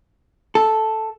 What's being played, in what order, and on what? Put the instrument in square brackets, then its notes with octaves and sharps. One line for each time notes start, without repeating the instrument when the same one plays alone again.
[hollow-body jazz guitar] A4